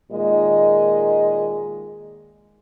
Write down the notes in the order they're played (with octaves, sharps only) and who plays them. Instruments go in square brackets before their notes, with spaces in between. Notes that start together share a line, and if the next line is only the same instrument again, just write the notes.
[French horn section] A#2 D#3 G#3 D#5